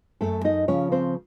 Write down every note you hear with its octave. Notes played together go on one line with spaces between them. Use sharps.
F#2 A3 A4
D#4 D#5
C#3 F3 C#4 C#5
C4 C5